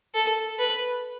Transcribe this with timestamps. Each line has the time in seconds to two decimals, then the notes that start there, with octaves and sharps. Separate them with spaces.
0.14 A4
0.59 B4